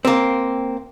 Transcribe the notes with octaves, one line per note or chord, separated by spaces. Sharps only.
A#3 C4